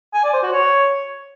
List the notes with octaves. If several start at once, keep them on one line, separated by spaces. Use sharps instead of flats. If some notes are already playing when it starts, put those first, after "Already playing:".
G#5
D5
C5
F#4
C#5